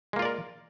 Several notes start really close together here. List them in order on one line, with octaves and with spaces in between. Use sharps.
G#3 A#3 F4 D5 A#4